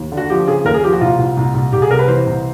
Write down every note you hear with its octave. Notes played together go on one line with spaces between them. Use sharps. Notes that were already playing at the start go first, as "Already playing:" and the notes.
Already playing: D#2
D3
F#4
F3 G4
C#3 G#4
D#2 A#4
G#4
F3 G4
F#4
C2 F4
C2
C2
C2
C2 G4
G#4
C3 A#4
B4
E3 C5
C2